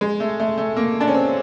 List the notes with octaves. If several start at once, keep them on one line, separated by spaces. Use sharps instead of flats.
G#3
A3
A3
A3
A#3
D4
C#4
C4